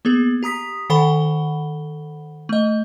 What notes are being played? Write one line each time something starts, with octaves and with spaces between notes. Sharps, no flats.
A#3 B3 G#4
G4 A#5 D#6 B6
D#3 A4 C5 F#5 B5 G7
A3 D#5